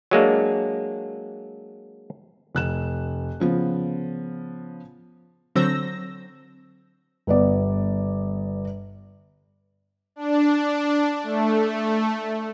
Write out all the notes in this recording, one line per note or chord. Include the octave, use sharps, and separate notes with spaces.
F#3 G#3 A#3 D4
F1 F#6 E7
C#3 F3 B3
D3 F#3 C4 E6 A#6
G1 B3 D5
D4
A3